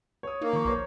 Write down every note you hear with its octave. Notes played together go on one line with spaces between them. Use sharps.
C#5 D#6
A#3 D#4
D#3 F3 C#6
B1 C5 C#5 A#5